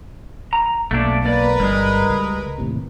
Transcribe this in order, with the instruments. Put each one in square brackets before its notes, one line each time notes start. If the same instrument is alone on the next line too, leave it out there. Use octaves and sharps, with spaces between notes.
[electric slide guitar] A#5
[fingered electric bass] B1 B2 [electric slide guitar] A3 A#3 D4
[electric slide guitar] A#3 D5 [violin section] A#4 B4
[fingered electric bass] G1 G2 [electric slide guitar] G3 G#3
[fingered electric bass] C#2
D#2 A2 C3